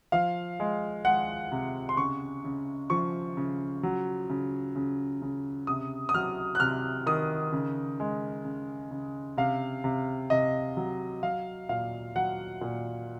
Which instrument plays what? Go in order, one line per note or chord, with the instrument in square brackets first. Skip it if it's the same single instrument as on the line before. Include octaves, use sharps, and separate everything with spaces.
[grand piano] F3 F5
G#3
G#3 F#5
C3
C6
C#3 C#6
C#3
F3 C#6
C#3
F#3
C#3
C#3
C#3
C3 D#6
D#6
F#3 F6
F#6
C3 F6
D#3 D#6
C#3
G#3
C#3
C#3
C3 F5
C3
C3 D#5
F#3
F#3 F5
A#2 F5
F#3 F#5
A#2